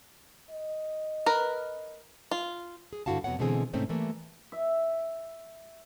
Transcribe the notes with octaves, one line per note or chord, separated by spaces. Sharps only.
D#5
A#4 B4
F4
G#4
G2 D3 E4 F#4 F5 A5
F2 C3 B3 F#4 C#5 F#5
B2 D3 E3 G#3 C4 G#4
G#2 C3 A3 C4 C#4 D#4
E3 G3 A3 A#3
E5